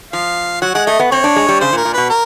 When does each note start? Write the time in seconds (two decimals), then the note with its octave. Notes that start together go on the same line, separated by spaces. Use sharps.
0.13 F3 F5
0.62 F#3 F#5
0.74 G#3 F#5
0.87 A3 D#5
1.00 B3
1.11 C4 C#5
1.24 D4
1.36 G#3
1.49 G3
1.60 C#3 C5
1.73 A#2
1.77 A#4
1.85 A#2
1.94 B2 B4
2.10 A#4